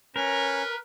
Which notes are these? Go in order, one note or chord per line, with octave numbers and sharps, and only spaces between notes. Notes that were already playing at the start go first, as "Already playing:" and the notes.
C#4 A#4 B4